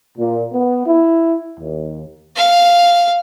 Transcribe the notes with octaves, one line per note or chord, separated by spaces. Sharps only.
A#2
B3
E4
D#2
F5